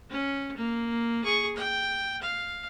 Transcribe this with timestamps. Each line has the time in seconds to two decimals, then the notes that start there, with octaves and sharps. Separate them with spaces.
0.10 C#4
0.57 A#3
1.24 G#4 C#6
1.56 G5
2.22 F5